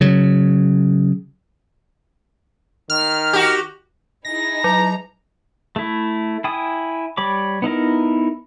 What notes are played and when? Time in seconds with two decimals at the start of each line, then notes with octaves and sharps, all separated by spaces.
0.01 C#3 F#3
2.90 D#3 F6
3.33 F#4 G4
4.25 D#4 E4 G#4 A#6
4.64 F#3 A#5
5.76 A3 E4
6.44 E4 G5 G#5 D#6
7.17 G3 C#5 B5 D6
7.62 B3 D#4 E4 A#4